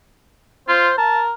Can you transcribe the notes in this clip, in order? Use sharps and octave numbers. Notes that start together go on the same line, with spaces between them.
F4 C5
A#4 A5